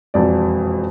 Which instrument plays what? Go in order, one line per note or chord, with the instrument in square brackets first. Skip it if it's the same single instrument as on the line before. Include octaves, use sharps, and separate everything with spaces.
[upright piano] E1 F2 D5